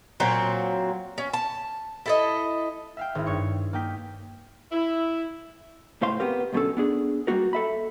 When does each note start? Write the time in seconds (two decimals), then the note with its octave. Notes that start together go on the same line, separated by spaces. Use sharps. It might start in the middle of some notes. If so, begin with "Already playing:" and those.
0.20 A#2 F#3 C4
1.18 C#4
1.33 A5
2.06 E4 A4 D#5
2.97 E5 F5 G5
3.15 G#1 E4
3.26 G2 C#5 C#6
3.73 A#3 D#4 G5 B6
4.72 E4
6.01 C#2 A2 C5 F5 C6
6.20 B3 C4 G4 A#4
6.53 C2 F#2 B2 D3 C#4 A4
6.77 B3 D4 G#4
7.27 G3 A3 A#3 F#4 A#4
7.53 A4 E5 B5